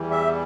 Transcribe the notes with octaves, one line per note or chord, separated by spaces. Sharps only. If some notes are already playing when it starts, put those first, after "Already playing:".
Already playing: E2 E3 G3
E5